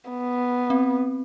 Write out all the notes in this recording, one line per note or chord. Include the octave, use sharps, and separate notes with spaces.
B3
C4